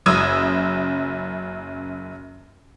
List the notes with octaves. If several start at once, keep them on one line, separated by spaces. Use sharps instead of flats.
F#1 F#2 D#6 E6 G#6 D#7